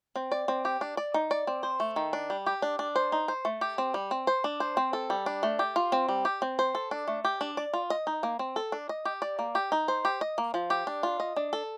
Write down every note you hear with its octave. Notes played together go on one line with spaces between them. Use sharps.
C4
D5
C4
G4
D4
D5
D#4
D5
C4
C5
A3
D#3
D4
G3
G4
D4
D4
C5
D#4
C5
A3
G4
C4
G3
C4
C5
D4
C5
C4
A4
G3
D4
A3
G4
F4
C4
G3
G4
C4
C5
A4
D4
A3
G4
D4
D5
F4
D#5
D#4
A#3
C4
A4
D4
D#5
G4
D5
A#3
G4
D#4
C5
G4
D#5
A#3
F3
G4
D4
F4
D#5
D4
A4